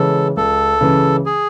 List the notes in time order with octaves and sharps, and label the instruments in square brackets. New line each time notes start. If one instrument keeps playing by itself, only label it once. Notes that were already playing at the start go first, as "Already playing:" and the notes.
Already playing: [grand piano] C#3 E3 G#3 C#4 [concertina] A4
[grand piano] C#2 [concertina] A4
[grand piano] C#3 E3 G#3 C#4
[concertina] G#4